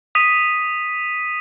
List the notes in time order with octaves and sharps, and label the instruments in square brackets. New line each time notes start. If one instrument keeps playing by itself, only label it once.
[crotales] D#6 B6 D#7